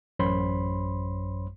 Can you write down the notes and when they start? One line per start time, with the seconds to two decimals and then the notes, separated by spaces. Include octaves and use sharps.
0.19 A1 F#2 C5 C#5 B5 C6